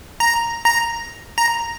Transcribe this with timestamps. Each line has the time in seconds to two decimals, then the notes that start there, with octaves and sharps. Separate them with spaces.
0.20 A#5
0.65 A#5
1.38 A#5